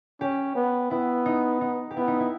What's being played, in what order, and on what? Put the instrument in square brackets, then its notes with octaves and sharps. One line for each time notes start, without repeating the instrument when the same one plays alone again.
[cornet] C#4 [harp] G4
[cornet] B3
[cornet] B3 [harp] E4
[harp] D#4
D#4
G4
[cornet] B3 [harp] E4
[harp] D#4
E4